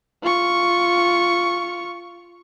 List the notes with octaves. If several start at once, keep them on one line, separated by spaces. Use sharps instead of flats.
F4 C#6